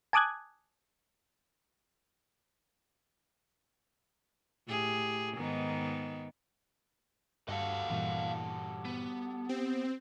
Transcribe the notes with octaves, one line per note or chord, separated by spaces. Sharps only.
G#5 A5 D6 D#6 F#6 G#6
A2 G4 G#4
G#2 D#3 B3
G2 G3 F#4 A4 D#5 F5
G2 A#2 E3
B3
C4 G4